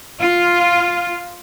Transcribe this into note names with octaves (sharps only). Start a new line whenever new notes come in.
F4